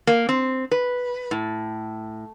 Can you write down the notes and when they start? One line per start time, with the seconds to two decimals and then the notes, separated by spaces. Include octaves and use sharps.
0.07 A#3
0.29 C4
0.71 B4
1.31 A2